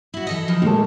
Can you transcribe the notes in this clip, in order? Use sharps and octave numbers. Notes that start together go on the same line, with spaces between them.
E4 F#4
E3 A4 D#5
E2 F3 D#4
A#2 D#3 G#3 A3